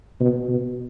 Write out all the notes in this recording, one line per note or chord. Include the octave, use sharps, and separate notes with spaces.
B2
B2